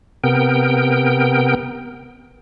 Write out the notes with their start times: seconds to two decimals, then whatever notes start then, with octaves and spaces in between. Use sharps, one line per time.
0.24 C3 B3 A#4 G5